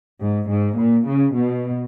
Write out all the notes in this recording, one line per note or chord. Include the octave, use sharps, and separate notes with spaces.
G#2
G#2
A#2
C#3
B2